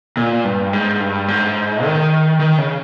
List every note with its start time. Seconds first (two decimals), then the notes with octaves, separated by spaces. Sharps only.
0.17 A#2
0.45 G2
0.73 G#2
1.00 G2
1.28 G#2
1.84 D#3
2.40 D#3
2.58 C#3